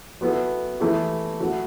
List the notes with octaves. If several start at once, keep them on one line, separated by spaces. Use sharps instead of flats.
F#3 B3 E4 A4
E3 A3 E4 G4
F#3 A3 E4